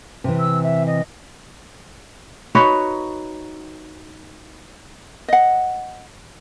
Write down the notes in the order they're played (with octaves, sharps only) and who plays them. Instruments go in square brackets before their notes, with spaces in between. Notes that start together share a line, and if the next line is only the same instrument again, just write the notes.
[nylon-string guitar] C3 E3
[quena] E6
E5
D#5
[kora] D#4 F#4 B4 C#5
[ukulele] D#5 F#5